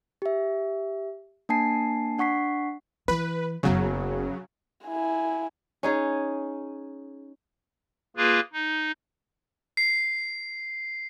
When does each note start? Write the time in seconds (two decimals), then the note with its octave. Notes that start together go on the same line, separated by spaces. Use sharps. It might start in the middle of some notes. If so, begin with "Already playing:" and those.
0.22 G4 E5
1.49 A#3 D4 G#5 A5 C7
2.18 D4 F#5 C#6 B6 C7
3.08 E3 B4
3.63 F#1 C#3 F#3 B3
4.87 E4 G#5
5.83 C#4 D#4 G#4
8.17 A#3 F4 G#4 B4
8.53 D#4
9.77 C7